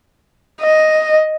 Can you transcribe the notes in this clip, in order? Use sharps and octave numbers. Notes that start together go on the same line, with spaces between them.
D#5